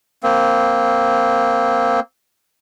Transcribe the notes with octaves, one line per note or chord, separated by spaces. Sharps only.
A#3 C4